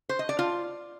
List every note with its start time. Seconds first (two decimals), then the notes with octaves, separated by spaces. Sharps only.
0.09 C5
0.19 D#5
0.29 D5
0.39 F4